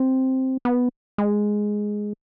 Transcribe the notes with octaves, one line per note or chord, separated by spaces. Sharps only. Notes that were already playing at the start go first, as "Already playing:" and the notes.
Already playing: C4
B3
G#3